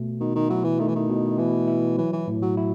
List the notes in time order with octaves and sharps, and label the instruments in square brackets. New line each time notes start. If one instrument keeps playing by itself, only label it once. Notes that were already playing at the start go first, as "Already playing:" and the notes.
Already playing: [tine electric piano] B2 A3
[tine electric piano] B2 [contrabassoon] D#3
[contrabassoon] D#3
[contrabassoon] F#3 [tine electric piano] E4
[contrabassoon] E3
[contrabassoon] D#3 [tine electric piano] A3
[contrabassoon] E3
D#3
[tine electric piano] B2
[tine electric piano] B2 [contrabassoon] E3
[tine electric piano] E4
[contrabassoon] E3 [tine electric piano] F#3
[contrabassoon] E3
[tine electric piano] A2
[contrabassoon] F#3
[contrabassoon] F#3 [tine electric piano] E4